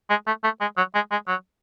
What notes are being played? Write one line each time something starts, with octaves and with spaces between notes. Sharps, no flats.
G#3
A3
A3
G#3
F#3
G#3
G#3
F#3